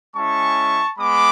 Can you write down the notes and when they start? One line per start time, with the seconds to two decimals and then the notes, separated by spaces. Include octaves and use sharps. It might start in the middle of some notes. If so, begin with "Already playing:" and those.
0.15 G#3 C#4 E4 A5 C#6
0.99 G#3 B3 B5 D6